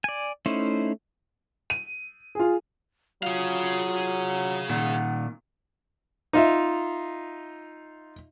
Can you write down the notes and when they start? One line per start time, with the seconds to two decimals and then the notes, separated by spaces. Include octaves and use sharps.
0.04 D5 G#5
0.46 A3 C#4 D#4 E4 C5
1.70 D#7
2.35 F4 G#4
3.23 F#3 F4 G#4 F5
4.69 A#2 D#3 F#5
6.33 D#4 F4 E5